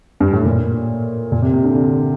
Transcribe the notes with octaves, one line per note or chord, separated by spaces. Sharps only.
G2
A2
A#2
A#2
C3
C3
D3
D3